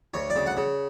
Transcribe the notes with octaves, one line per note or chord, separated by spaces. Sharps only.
D2 C#5
D5
C#3
F#5
C#3